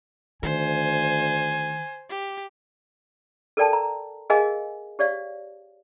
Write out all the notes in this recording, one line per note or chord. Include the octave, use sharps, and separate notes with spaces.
D2 D#3 C5 G#5
G4
A4 A#4 D5 G5 A5
A#5
G#4 A#4 D#5 F5 G#5
G4 C#5 D5 F5